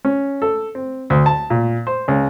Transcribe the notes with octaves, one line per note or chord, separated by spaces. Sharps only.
C#4
A4
C4
D2
A5
A#2
C5
C#2